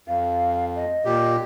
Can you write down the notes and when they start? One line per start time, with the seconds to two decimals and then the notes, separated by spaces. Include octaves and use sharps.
0.08 F2 F5
0.75 D#5
1.05 A#2 G4